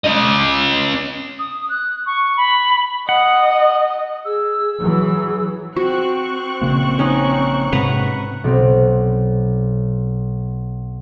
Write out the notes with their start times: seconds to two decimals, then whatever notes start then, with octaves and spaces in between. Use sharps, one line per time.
0.04 C#4 D#5
1.39 D#6
1.69 F#6
2.06 C#6
2.37 B5
3.09 D#5 F#5
4.25 G#4 E6
4.79 E3 F#3 G#4
5.76 C4 F#4 C#6 F#6
6.61 A#1 C#3 A#3
6.99 C#4 D#4
7.72 G#2 C3 G#3 B4 F#5 A#5
8.44 B1 C4